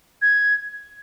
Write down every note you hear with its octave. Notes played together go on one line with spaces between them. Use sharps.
G#6